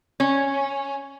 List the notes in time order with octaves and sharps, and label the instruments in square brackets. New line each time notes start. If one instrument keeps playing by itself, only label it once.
[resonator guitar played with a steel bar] C#4